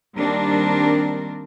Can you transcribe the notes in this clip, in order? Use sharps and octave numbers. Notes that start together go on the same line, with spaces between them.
D#3 G3 A#3 C4 D4 A#4